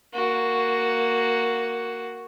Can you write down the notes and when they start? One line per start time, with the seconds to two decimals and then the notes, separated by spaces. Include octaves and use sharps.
0.14 A#3 F#4